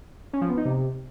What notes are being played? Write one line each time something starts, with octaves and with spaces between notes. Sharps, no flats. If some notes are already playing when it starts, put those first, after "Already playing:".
C#4
F3
B3
D#4
C3